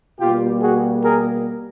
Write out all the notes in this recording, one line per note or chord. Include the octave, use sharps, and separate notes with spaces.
B2 G3 A#3 F4 G4
F#4 G#4
G#4 A#4